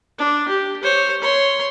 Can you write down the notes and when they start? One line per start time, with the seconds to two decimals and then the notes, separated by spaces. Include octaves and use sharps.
0.19 D4
0.49 G4
0.83 C5 C#5
1.22 C#5 C6